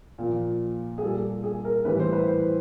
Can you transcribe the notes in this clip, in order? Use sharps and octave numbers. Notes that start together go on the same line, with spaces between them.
A#2 F3
G#4
A#2 G3 A4
G#4
A#4
A2 E3 G3 B4
C5
B4
C5